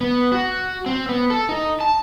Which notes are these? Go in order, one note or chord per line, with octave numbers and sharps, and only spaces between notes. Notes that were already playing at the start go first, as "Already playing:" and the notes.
B3
F#4
C4
B3
A4
D#4
A5